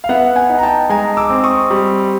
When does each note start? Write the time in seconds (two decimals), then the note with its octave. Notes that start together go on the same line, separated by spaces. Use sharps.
0.04 F5
0.09 B3 E5 F#5
0.36 F#5 G#5
0.49 D#4
0.59 A#5
0.63 G5 A5
0.90 G#3 G#5 A#5
1.17 D6 E6
1.30 C4
1.44 C#6 D#6
1.70 G3